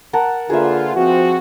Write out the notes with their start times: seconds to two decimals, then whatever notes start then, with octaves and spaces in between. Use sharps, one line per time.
0.13 A#4 F#5 A5
0.50 D3 A#3 F4 G#4 B4 E5
0.95 F3 C4 F#4